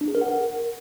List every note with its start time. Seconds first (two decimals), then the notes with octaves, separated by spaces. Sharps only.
0.01 D4
0.08 G#4
0.15 A#4
0.21 F#5
0.28 A#4